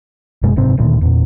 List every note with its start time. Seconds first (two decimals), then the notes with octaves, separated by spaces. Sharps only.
0.43 F#1 F#2 B2 G#3
0.56 F#1 G#2 C3 C4
0.77 D1 D2 A#2 D#3
1.01 E2 A#2